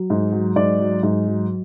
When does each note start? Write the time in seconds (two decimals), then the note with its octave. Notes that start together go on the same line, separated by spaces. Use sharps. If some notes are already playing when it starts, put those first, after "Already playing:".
Already playing: F#3
0.10 G#2
0.32 F#3
0.56 G#2 D5
0.79 F#3
1.03 G#2
1.27 F#3